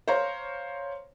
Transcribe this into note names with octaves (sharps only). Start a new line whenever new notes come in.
C5 C#5 F5 A#5